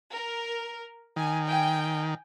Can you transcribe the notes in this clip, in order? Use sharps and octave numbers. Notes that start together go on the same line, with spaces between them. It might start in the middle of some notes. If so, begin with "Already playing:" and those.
A#4
D#3 G#5
G5 G#5